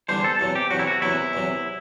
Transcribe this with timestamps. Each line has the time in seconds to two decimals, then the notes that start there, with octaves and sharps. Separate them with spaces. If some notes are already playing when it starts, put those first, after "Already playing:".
0.09 E2 D3 G3 D4 C5
0.24 A4
0.40 E2 C3 F#3
0.55 G4
0.70 E2 C3 F#3 F#4
0.79 E4
0.87 F#4
1.02 E2 C3 F#3 E4
1.33 E2 C3 F#3